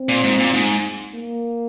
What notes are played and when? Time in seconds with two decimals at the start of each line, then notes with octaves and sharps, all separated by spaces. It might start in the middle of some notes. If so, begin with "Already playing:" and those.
Already playing: C4
0.09 A#2
0.24 G#2
0.39 A#2
0.53 G#2
1.14 A#3